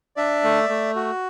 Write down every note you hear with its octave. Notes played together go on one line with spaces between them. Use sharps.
D4 D5 E5
A3
A3
F#4